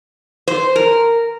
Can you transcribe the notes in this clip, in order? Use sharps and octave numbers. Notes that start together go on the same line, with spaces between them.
C5
A#4